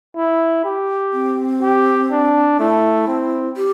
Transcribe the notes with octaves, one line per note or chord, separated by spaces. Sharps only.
E4
G4
C4
G4
D4
A3 E4
C4
G4